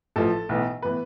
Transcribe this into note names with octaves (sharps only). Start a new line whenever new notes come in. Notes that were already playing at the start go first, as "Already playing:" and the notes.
A1 A2 F3 A4
B1 A2 E3 B3
A2 E3 B3 B4